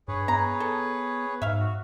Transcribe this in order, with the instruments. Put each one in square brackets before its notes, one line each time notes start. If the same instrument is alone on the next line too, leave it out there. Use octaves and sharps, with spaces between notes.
[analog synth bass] G2 [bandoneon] G#4 B4 C#5
[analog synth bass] B3 [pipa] A#5
[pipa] A4
[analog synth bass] G#2 [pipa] E5 F5
[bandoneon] F#4